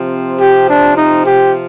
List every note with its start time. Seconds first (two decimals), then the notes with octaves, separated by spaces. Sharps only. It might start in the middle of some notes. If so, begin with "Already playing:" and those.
Already playing: C3 F3 C4
0.38 G4
0.67 D4
0.96 D#4
1.25 G4